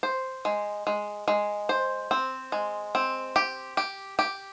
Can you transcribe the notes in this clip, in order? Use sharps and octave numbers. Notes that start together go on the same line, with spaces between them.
C5
G#3
G#3
G#3
C5
C4
G#3
C4
G4
G4
G4